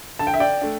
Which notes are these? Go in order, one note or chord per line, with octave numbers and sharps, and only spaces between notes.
D3 A5
G5
E5
D5 G5
A3 D4